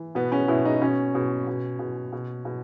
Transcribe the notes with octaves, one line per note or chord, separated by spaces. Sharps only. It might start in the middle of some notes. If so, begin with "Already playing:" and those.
Already playing: E3
B2 B3
C#4
B2 E4
D#4
B2 C#4
B2
B2
B2
B2
B2